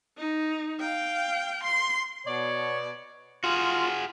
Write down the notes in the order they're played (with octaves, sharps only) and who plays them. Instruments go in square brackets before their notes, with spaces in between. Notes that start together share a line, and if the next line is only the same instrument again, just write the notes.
[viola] D#4
F5 G5
C6
[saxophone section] B2 D5 [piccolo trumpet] C#5
[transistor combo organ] F4 [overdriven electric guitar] F#4 G#4